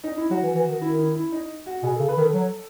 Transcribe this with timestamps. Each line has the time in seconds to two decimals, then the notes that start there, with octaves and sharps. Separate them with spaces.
0.04 D#4
0.17 E4
0.31 F#3 F#4
0.43 E3
0.55 E3
0.69 D#3
0.81 D#3 E4
0.99 E4
1.15 E4
1.32 D#4
1.66 F#4
1.83 B2 G#4
1.96 C#3 A4
2.09 B4
2.17 D#3
2.21 A4
2.34 F#3